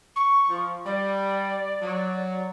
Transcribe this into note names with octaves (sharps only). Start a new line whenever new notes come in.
C#6
F3
G3 D5
F#3